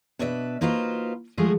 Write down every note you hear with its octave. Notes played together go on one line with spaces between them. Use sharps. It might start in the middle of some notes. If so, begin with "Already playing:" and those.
B2 D4 B4 D#5 E5
A#3 D#4 F4 F#4 B4 C5
F3 G#3 A3 F4 F#4 G#4